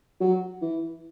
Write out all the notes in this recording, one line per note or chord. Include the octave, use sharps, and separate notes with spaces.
F#3
E3